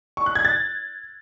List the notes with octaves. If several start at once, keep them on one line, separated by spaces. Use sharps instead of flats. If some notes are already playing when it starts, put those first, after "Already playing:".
C#6
F#6
G#6
A6